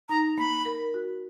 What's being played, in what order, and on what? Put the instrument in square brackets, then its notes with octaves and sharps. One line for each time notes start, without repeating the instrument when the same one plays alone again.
[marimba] D#4 [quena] A#5
[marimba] A#3 [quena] B5
[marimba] A#4
F#4